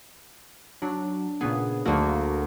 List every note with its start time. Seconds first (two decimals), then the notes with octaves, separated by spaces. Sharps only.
0.82 F#3 D4
1.41 A#2 C#3 B3 G#4
1.86 D2 A3 A#3 F#4